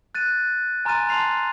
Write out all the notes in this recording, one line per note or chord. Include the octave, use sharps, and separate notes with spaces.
F#6 A6 D#7
G#5 A#5 C6 F6 A6 D#7
A5 C6 F6 C7 F7